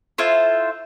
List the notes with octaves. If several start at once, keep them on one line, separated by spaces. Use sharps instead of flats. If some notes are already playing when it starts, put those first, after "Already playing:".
E4 F4 A4 C5